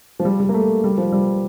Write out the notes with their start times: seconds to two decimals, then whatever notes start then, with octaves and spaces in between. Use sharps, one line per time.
0.20 F3
0.25 G3
0.40 G3
0.49 A#3
0.54 A3
0.84 G3
0.98 F3
1.12 G3